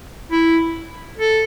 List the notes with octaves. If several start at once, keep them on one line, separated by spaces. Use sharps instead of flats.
E4
A4